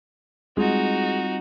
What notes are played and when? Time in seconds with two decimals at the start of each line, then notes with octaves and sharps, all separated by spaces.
0.57 G3 G#3 C4 D#4 F4 F#4